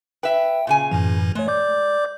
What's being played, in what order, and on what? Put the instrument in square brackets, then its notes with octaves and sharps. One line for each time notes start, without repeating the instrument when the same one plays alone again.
[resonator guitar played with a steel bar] B4 E5 [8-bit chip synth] G5
[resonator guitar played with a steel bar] A#2 C#3 G#5
[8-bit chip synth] F#2 A2 E3
[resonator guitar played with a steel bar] G#3 [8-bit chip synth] A3 C#5
[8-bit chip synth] D5 D6 G6